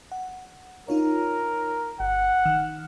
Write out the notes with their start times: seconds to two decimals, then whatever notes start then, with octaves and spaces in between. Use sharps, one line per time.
0.12 F#5
0.88 D#4 F4 A#4 C#5
2.00 G1 F#5
2.45 D#3 F6